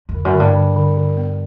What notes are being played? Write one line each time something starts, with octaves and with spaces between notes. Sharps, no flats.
F2
D3
F#2
D3
G2
D3
D3
D3
B3